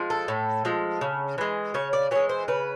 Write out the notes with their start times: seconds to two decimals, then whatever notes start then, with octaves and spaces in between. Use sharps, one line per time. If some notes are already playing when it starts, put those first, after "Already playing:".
Already playing: F3 G#3
0.10 A4
0.28 A2
0.65 F3 G#3
1.01 C#3
1.38 E3 G#3
1.74 C#3 C#5
1.93 D5
2.11 E3 G#3 C#5
2.29 C5
2.48 C#3 B4